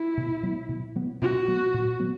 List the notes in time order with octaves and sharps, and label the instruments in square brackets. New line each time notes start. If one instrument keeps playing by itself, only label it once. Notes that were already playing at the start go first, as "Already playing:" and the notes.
Already playing: [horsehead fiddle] E4
[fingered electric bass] B2
F#3 B3
B2
F#3 B3
[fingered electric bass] B2 [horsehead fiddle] F#4
[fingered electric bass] F#3 B3
A#2
F#3 B3